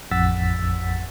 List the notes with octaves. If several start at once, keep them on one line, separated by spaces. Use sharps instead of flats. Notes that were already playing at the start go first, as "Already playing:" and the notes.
A1 F2 F#5 E6 A6 B6